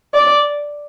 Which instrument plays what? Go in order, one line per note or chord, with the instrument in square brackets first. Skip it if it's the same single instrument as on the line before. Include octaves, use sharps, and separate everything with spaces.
[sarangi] D5